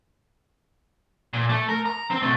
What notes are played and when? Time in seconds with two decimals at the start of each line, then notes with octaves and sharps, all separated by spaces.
1.33 A#2
1.50 A3
1.69 A#4
1.86 A#5
2.11 C4
2.22 B2 A3